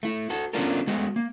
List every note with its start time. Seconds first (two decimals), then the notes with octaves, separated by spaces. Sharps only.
0.03 A3 E4
0.30 F#4 A4
0.53 B3 C#4 D4 F4 A4 A#4
0.87 G#3 A3 B3 F#4
1.16 A#3